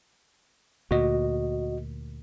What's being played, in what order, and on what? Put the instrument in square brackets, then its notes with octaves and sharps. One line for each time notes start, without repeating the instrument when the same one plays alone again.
[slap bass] D2 A#2 [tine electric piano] F#4 D#5